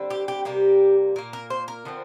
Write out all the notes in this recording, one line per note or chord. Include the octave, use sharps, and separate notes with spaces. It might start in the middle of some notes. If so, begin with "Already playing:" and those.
Already playing: D3 G3 C4
G4
G4
C3 G3 A#3 G4
A#2 A#3 A#4
A#4
C5
A#4
D3 F3 C4